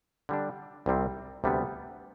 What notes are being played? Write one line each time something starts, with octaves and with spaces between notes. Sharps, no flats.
D3 G3 D4
C2 C3 G3 C4
D2 C3 G3 B3